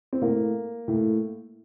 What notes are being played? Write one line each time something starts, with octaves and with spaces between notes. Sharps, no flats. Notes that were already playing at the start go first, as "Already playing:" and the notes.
C4
A2 A#3
A2